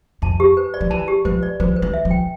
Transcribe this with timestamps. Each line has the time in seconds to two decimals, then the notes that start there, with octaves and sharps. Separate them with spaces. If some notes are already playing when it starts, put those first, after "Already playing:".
0.22 F2 A5
0.40 G4
0.57 B4
0.74 D5
0.81 F3
0.90 E3 A5
1.08 G4
1.25 F3 B4
1.43 D5
1.60 F3 B4
1.76 B4
1.82 E3
1.94 E5
2.05 F3
2.11 G5